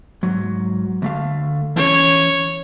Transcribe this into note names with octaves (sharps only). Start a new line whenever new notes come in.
G#2 F#3
D2 A3 F5
E3 C#4 C#5